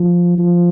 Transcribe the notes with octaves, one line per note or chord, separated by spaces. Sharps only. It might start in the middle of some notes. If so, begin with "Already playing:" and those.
Already playing: F3
F3